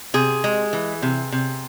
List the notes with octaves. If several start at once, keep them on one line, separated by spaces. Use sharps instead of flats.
C3 G#4
G#3
E3
C3
C3